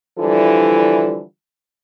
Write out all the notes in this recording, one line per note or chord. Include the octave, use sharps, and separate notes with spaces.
D3 E3 F3 G3 E4 A4